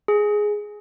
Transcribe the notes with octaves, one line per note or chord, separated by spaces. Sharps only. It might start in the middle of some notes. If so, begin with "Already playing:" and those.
G#4